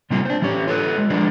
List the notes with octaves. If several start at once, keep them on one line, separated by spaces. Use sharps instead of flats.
C3 G3 A#3 C4 F4
D4 C5
E3 C#4 G4 C#5
F4 A4 B4
G#3
F3 G#3 D4 F4 G#4 D5